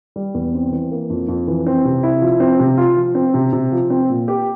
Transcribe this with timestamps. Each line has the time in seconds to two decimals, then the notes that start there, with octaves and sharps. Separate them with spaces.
0.16 G3
0.34 E2
0.54 C4
0.72 E3
0.91 A#3
1.10 F2
1.28 F2
1.47 E3
1.66 C4
1.85 C3
2.03 E4
2.21 F3
2.40 C4
2.60 C3
2.77 F4
2.97 F3
3.15 C4
3.34 C3
3.53 C3
3.72 F3
3.90 C4
4.09 A#2
4.28 G4